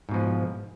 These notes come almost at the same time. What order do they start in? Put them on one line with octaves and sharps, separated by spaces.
G#2 B2 F3